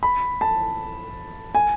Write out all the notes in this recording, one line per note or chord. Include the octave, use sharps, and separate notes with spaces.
B5
A5
G#5